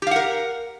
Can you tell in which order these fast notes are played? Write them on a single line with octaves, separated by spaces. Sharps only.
G4 F5 F#5 A#4